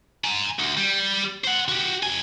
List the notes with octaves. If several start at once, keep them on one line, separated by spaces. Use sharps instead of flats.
G#5 A#5
D2
G3
C5 F#5
F#4 G4
F2 G#5